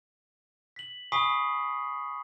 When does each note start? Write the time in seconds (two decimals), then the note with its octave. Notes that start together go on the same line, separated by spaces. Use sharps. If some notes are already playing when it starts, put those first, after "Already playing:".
0.76 B6 F#7
1.12 G#5 B5 C#6 D#6 B6 C7